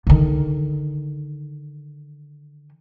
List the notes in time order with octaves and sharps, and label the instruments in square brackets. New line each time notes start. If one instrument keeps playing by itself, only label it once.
[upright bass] D3 D#3